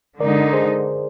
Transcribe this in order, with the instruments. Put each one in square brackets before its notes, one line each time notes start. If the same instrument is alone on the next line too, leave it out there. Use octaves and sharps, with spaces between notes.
[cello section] D3 G#3 D#4 [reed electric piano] A#4 D5
[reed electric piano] G#4 C5